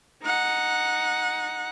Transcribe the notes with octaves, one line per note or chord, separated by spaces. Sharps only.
D#4 F#5